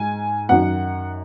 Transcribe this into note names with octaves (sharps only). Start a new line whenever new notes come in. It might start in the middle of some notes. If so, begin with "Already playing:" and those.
Already playing: G#2 G#5
F#2 D#3 F#5